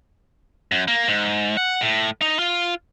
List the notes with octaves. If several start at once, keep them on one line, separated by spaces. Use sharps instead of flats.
F#2
A#3
G#2
F#5
A2
D#4
F4